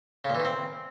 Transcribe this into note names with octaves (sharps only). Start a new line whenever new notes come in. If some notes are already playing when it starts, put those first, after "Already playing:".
C#3
A#2
E3
D#3
C4